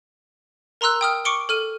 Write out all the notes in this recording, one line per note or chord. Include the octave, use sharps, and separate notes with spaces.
A#4 A#5 C6 E6 F#6
G5 D#6 F6
C#6 D6 C#7 D7 G7
A4 F6 D#7